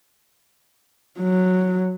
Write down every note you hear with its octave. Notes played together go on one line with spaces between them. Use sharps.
F#3